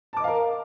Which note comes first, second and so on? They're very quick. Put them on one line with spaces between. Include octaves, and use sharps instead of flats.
A5 D6 D#5 F5 A#4